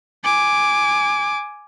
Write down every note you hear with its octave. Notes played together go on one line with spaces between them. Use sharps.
G#5 D6